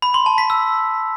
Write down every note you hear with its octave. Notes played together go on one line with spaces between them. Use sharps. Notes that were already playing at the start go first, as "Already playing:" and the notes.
B5
C6
A5
B6
E6